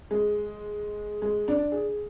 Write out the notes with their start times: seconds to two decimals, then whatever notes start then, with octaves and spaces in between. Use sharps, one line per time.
0.11 G#3
1.22 G#3
1.48 D4
1.72 G#4